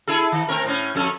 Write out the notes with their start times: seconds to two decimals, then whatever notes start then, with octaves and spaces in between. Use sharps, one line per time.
0.08 E4 G#4 A4
0.32 D#3
0.48 A3 C4 A#4
0.64 A2 C#4
0.95 F2 C#4 A4